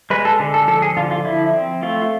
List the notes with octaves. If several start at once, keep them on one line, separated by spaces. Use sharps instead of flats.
G#3 B4
A4
D3
A4
F3 A4
G#4
D3 F4
F4
F3 E4
C4
A3 F4